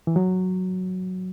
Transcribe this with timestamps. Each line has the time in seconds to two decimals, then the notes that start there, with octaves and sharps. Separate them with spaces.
0.07 E3
0.16 F#3